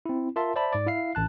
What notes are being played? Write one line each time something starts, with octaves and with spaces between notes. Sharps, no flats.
C4 E4
F4 A#4 E5 A5 C6
C5 D5 E5 A5 B5
G#2 D5
E4 E5 F5 C7
A1 A5 F#6